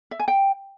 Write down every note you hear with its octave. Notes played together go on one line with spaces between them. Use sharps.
E5
G#5
G5